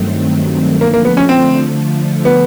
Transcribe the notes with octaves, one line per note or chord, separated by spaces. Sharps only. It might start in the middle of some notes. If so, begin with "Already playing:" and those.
Already playing: G2 D#3 F#3 A3 C4
D3 F3 A3 A#3
A#3
B3
C#4
C4
B3